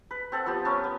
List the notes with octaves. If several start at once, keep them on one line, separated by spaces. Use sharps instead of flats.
B4
C4 A4 F#5
F3 B3 G4
B3 C#4 A#4
B3